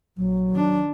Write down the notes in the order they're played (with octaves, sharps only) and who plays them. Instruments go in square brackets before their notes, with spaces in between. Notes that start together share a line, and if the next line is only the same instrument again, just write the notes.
[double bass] A#1 [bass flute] F#3
[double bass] D#3 D4